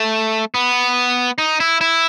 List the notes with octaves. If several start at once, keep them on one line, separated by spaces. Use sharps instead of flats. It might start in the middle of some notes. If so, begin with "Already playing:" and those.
Already playing: A3
B3
D#4
E4
E4